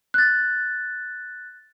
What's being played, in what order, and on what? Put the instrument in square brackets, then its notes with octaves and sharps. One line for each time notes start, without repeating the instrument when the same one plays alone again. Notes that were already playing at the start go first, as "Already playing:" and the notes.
[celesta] F#6 A6